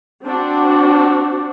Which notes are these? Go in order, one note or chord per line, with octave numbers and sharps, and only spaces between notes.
C4 D4 F#4